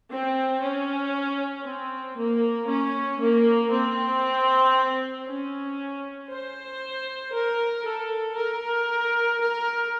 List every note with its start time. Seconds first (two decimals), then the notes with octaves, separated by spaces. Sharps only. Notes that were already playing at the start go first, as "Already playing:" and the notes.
0.09 C4
0.60 C#4
1.64 C4
2.16 A#3
2.67 C#4
3.20 A#3
3.70 C4
5.25 C#4
6.28 C5
7.32 A#4
7.83 A4
8.35 A#4
9.39 A#4